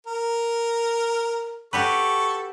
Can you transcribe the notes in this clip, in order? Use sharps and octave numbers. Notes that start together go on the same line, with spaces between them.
A#4
F#4 G4 A4 B4 C#6